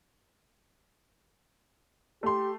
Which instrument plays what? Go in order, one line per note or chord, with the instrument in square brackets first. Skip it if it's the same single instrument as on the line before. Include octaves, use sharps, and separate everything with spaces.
[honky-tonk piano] A3 C6 [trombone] G4